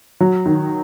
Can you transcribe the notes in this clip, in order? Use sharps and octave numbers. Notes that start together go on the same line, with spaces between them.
F#3
D#3